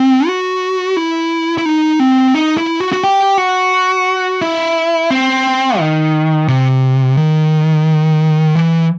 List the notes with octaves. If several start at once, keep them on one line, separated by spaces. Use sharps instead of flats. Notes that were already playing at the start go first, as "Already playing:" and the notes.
Already playing: C4
F#4
E4
E4
D#4
C4
D#4
E4
F#4
F#4
G4
F#4
E4
C4
D#3
C3
D#3
E3